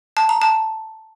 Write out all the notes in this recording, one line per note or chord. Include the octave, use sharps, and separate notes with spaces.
A5
A#5
A5